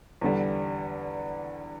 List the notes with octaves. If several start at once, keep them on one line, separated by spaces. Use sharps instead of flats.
E2 D3 G3